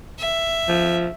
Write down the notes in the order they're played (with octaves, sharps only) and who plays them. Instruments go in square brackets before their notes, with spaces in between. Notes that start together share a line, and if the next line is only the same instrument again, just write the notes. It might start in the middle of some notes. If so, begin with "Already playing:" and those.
[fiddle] E5
[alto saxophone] F3